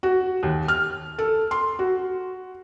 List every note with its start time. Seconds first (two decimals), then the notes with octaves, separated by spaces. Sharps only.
0.03 F#4
0.43 D#2
0.68 F6
1.18 A4
1.51 C6
1.79 F#4